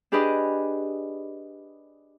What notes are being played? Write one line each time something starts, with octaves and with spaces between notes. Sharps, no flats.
D4 G4 G#4 B4 D5 D#5